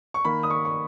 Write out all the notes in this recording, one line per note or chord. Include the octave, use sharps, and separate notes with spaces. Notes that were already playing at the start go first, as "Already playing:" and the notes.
C#6
D#3 A#3 B5
D#6
C#6
C#6